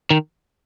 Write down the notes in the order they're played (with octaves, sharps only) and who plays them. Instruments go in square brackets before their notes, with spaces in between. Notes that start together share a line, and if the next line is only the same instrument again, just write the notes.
[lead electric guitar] D#3